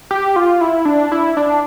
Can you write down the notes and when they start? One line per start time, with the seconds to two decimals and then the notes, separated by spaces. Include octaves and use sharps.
0.11 G4
0.36 F4
0.61 E4
0.85 D4
1.12 E4
1.37 D4